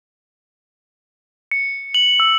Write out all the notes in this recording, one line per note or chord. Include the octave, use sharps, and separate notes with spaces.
C#7
F#7
E6